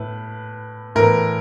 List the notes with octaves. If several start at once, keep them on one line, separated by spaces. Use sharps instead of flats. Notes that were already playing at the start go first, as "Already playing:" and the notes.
Already playing: A2 B4
A2 E3 A#4